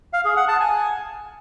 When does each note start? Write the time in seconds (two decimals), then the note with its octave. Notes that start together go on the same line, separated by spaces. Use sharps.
0.13 F5
0.25 G#4
0.37 F#5
0.48 A5
0.60 G#5